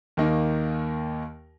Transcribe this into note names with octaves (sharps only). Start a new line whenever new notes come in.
D#2 D#3 A#3 D#4